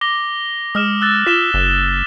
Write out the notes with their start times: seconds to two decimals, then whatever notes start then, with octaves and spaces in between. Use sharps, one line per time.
0.01 D6 A#6 G7
0.75 G#3 D#6 F6 E7
1.01 E6 F#6 A6
1.26 F4 B6 E7 G7
1.54 F#1